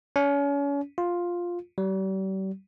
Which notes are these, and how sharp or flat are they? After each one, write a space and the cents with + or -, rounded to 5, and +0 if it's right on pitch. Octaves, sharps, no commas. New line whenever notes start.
C#4 +35
F4 +5
G3 -40